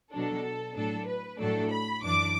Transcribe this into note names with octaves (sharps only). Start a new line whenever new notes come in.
B2 F#3 D4 A4
A2 F#3 D4 A4
B4
A2 F#3 A3 D4 A4
B5
F#2 E3 D4 D6